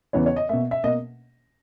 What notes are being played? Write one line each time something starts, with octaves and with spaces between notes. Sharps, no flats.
E2 C#3 E3 B3 C#5
C#5
D#5
B2 A#3 E5
E5
B2 A#3 D#5